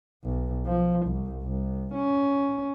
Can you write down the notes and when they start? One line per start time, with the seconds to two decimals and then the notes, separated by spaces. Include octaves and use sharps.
0.24 B1
0.66 F3
1.06 C2
1.42 C2
1.94 C#4